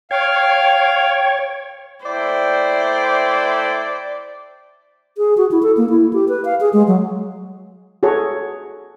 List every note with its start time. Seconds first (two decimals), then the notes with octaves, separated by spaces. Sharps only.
0.11 C#5 F5 G5
2.05 A3 E4 C5 D5 G5
5.18 G#4
5.37 F#4
5.51 E4
5.63 A4
5.77 A#3
5.90 E4
6.13 G4
6.29 B4
6.45 F5
6.60 G#4
6.73 G#3
6.88 F#3
8.03 F#4 G#4 A4 C#5